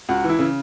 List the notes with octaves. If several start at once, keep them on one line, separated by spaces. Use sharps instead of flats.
C#2 F#4
E3
E4
C#3